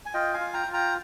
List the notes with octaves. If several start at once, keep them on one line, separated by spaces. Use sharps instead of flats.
G#5
F4 D#5 G5
F5 G#5
F4
G5 A#5
F4
G5 A#5